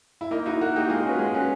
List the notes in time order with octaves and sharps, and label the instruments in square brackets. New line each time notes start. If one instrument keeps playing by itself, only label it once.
[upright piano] E4
[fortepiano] A#3 [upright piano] D#4
[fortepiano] D#4 F#4 [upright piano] E4
[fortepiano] A#3 [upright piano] F#4
[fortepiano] D#4 [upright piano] G4
[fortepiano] F#4
[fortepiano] G#3 [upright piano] F4
[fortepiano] C#4 F#4 B4
G#3
C#4 F#4 B4